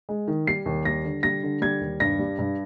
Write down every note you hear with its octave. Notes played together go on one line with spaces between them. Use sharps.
G#3
D#3
G3 C7
D#2
G3 A#6
D3
G3 A#6
D3
G3 G#6
D#2
G2 A#6
G3
G2